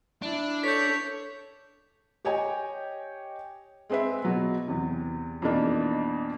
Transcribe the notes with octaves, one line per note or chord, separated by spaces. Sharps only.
D4 E4
A4 C#5 G6 B6
G4 C#5 D#5 G5 G#5
G#3 C4 G#4 B4 E5
B2 F#3 B3
E2 C3
F2 B2 E3 A#3 D4 D#4